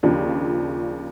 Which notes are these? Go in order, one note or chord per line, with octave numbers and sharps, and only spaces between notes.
D#2 C#3 F3 D4